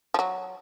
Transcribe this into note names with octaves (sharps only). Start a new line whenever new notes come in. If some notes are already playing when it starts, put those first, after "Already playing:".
F3
F#3